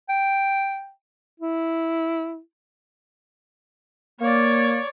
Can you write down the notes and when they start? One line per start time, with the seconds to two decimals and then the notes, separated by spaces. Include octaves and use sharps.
0.10 G5
1.40 E4
4.20 A#3 C#5 D5